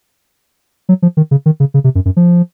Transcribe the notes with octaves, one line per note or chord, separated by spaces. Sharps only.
F#3
F3
D#3
C#3
D#3
C#3
C#3
C3
F#2
F#2
F3